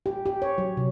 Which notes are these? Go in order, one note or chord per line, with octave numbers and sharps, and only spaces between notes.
G4
G4
C#5
F#3
C3